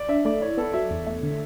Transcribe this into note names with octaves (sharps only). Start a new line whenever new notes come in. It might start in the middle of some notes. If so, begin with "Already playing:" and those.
Already playing: D5
D4 E5
A3 D5
E4 C#5
B3 A4
F#3 E5
E2
A3
D3